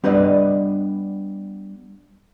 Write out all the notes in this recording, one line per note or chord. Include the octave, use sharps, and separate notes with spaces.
G3 B3 D4 B4 D5 D#5